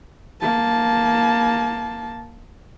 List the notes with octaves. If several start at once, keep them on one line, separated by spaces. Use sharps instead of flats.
A#3 A5